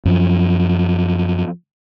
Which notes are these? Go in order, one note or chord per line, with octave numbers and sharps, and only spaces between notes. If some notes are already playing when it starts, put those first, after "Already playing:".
F#2 F3